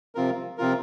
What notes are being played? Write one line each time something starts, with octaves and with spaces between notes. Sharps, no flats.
C3 F3 C4 F4 A#4
C3 F3 C4 F4 A#4